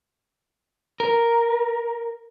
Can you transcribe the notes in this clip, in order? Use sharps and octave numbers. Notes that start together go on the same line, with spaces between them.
A#4